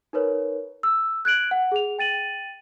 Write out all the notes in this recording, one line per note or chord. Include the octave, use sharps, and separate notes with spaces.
D#4 A#4 B4 C#5
E6
F#6 G#6 D7 F#7
F#5
G#4 F7
G5 A6 D#7 F#7